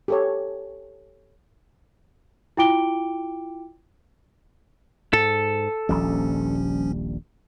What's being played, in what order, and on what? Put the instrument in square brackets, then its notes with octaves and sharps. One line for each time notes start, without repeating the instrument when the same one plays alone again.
[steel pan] G4 A4 C#5
[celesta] E4 F4 G5 D6 D7 G7
[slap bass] G#2 [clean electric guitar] A4
[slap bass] D#1 A#1 G3 [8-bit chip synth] F3 C#4